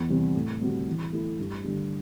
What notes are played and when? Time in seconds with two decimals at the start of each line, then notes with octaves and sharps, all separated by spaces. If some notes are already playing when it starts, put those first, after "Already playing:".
Already playing: E2
0.09 C3 E3 G3 C4
0.35 A2
0.61 G3 C4 F#4
0.87 E3
1.12 A3 E4
1.39 G2
1.64 D3 G3